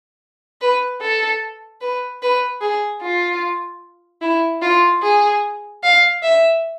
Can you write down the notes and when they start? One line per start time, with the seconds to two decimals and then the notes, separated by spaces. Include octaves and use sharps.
0.61 B4
1.02 A4
1.81 B4
2.22 B4
2.61 G#4
3.02 F4
4.22 E4
4.62 F4
5.03 G#4
5.83 F5
6.23 E5